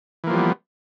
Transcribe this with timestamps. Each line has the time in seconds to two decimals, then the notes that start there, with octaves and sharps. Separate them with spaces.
0.24 E3
0.27 A#3
0.30 F3
0.33 G3
0.37 B3